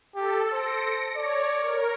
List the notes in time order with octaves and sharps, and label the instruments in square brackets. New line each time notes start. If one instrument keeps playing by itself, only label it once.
[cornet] G4 [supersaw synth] A4
[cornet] C5 [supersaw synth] A#6 C#7 D7
[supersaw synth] C#5 [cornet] D5
[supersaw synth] A#4